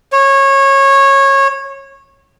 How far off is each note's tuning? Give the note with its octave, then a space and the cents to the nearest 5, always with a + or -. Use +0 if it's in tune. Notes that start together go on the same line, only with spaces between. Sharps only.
C#5 -20